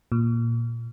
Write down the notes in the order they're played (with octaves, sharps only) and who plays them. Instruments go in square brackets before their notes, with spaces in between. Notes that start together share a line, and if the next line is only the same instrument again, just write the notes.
[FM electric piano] A#2